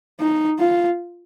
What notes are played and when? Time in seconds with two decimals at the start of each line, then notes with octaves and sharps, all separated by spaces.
0.20 D#4
0.59 F4